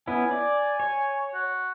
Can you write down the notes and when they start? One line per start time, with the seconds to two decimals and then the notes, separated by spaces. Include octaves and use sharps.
0.08 B3 C#4 E4 G#5
0.31 D5
0.80 C#5
1.34 F#4